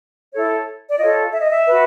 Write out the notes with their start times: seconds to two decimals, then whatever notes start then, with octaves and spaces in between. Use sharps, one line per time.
0.33 E4 A4 C#5
0.88 D5
0.99 F4 A4 C#5 D#5
1.32 E5
1.42 D#5
1.51 E5
1.66 F#4 B4